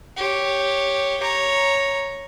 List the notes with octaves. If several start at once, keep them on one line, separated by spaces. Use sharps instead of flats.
G4 C#5
C#5 A#5